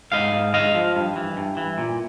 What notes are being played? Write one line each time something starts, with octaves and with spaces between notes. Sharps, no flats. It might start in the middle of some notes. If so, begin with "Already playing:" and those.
G#2 D#5 F5
G#2
G#3 D#5 F5
F3
G2
E3
G2
E3
A#2